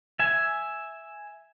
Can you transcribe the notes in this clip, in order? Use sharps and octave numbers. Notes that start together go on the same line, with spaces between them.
E5 G#5